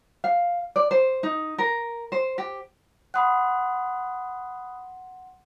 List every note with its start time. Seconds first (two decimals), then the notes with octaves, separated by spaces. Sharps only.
0.24 F5
0.76 D5
0.91 C5
1.23 D#4
1.58 A#4
2.12 C5
2.38 G4
3.14 F#5 B5 C6 D#6 F#6